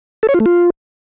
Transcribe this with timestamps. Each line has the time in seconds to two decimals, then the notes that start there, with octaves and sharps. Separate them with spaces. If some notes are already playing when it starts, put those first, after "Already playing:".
0.23 A4
0.29 C#5
0.34 F4
0.40 A3
0.46 F4